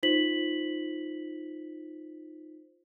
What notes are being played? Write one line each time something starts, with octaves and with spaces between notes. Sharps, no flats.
D#4 F4 C5 B6 F#7